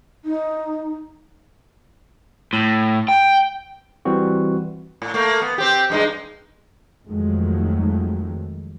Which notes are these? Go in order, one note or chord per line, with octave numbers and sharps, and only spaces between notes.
D#4
A2
G5
E3 G3 C4 F#4
A2
A3 A#3
B3
C4 G4
G2 G#3 D#4
F2 D#3 F3 F#3 G#3 A3